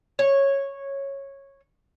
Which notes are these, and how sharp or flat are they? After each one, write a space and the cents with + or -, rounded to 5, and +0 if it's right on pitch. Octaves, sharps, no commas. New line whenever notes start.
C#5 -10